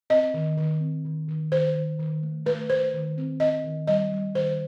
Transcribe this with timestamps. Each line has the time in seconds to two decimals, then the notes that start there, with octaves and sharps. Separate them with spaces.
0.10 C4 D#5
0.34 D#3
0.57 D#3
0.80 C4
1.05 D#3
1.28 D#3
1.52 D#3 C5
1.75 D#3
1.99 D#3
2.23 A3
2.46 A3 B4
2.70 A3 C5
2.94 D#3
3.17 C4
3.40 C4 D#5
3.64 D#3
3.87 G3 D#5
4.12 G3
4.35 D#3 C5